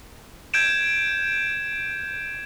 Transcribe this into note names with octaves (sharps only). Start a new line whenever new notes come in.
G6 G#6 D7 E7